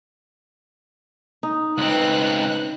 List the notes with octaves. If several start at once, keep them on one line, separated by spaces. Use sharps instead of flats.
D#4
C#2 C4 B4 D#5 F#6